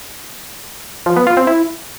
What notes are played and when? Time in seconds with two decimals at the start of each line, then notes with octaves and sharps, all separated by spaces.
1.06 F3
1.16 B3
1.27 F4
1.37 C4
1.47 E4